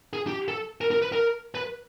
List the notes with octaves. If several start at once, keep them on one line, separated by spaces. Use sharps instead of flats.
G#4
G4
A4
A#4
A#4
B4
A#4
B4